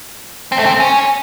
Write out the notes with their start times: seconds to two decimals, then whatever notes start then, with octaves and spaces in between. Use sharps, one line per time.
0.52 C4
0.59 A3
0.66 C4
0.80 C#4